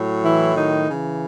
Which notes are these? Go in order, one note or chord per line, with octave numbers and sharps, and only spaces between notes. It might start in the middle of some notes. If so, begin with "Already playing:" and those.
Already playing: A2 F#3
E3 E4
D#3 D#4
C#3 E3